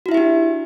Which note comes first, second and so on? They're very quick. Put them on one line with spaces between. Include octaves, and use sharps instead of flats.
F#4 E4 E5 G4 D4